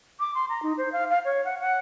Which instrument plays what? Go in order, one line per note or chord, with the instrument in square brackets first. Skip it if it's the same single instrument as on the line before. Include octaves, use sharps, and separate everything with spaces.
[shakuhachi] D6
C6
A#5
D#4
C5
F5
F5
C#5
F#5
F#5